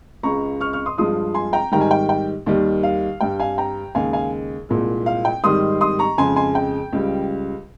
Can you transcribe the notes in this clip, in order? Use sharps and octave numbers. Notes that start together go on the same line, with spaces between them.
C#2 C#3 G#3 A#5 C#6
C#6 F6
C#6 F6
C6 D#6
G2 F3 G#3 C6 D#6
G#5 C6
G5 A#5
G#2 D#3 G3 G5 A#5
G#5
G5
G5
D#2 D#3 G3
F5
G2 G3 G5
F5 G#5
G5 A#5
D#2 C#3 G#3 F5 G#5
F5 G#5
C2 A#2 G#3
F5
G5
G#2 D#3 G3 C6 D#6
C6 D#6
A#5 C#6
F2 C#3 G#3 G#5 C6
G#5 C6
G5
C#2 C#3 G3